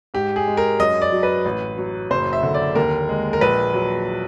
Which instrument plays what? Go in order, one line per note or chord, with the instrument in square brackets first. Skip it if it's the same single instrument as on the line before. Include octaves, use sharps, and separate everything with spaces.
[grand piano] G#2 G4
G#4
G#3
A#4
F#2 D#5
D5
F#3
B4
A1
F#3
F#1 C5
E5
D3
D5
D#2 A#4
G#3
A#4
A#1 B4
F#3